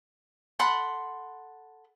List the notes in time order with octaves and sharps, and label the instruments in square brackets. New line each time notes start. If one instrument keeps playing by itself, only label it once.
[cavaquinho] A4 F#5 B5 C6